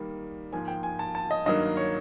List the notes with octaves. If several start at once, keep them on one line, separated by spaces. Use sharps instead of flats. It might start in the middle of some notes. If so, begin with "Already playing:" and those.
Already playing: D#3 G3 A#3
G#2 F3 A#3 G#5
G5
G#5
A5
A5
D#5
G2 D#3 F#3 A#3 D#5
C#5